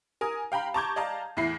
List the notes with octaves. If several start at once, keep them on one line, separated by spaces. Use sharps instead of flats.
A#4 G#5 D#6
F5 G5 A#5 B5
A5 A#5 C#6 D6 G6 G#6
D5 D#5 F5 A5 A#5
E2 A2 E4 C7